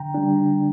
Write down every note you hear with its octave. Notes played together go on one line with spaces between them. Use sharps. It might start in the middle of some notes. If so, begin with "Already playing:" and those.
Already playing: D3 G5 A#5
G3 D4